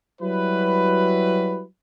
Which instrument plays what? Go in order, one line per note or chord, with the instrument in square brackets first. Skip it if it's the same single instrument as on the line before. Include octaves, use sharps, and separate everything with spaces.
[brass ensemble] F#3 G3 E4 F#4 B4